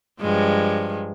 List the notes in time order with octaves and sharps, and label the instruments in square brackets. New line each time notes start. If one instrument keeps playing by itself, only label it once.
[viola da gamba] G2 F3 G#3